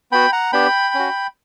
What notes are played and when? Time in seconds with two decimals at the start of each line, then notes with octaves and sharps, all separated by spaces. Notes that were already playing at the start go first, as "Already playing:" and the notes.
0.12 B3 F#4 G5 B5
0.33 F#5 A#5
0.52 B3 D4 G4 G5 B5
0.94 C#4
0.99 F#4